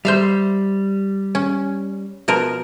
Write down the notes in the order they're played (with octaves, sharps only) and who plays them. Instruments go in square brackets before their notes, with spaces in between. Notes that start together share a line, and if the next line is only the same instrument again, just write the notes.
[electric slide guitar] G3 [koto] C5 E5 F5
[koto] C#4
B2 F3 A#4